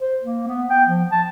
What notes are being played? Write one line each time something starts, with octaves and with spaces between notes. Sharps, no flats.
C5
A#3
B3
G5
F3
A5